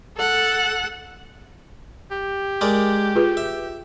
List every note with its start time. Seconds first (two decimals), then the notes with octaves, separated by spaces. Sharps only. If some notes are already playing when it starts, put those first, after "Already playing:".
0.17 A4 F#5
2.11 G4
2.61 G#3 A#4 D5
3.15 F4 G#4 B4
3.37 E5